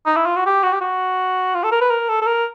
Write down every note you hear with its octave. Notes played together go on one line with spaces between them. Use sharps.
D#4
E4
F4
F#4
G4
F#4
G4
F#4
F4
A4
A#4
B4
A#4
A4
A4
A#4